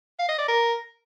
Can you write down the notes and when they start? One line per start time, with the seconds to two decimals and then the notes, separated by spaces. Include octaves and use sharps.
0.19 F5
0.29 D#5
0.38 D5
0.48 A#4